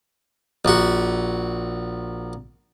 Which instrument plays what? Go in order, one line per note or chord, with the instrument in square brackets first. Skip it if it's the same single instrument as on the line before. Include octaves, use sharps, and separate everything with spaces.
[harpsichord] A#1 F#4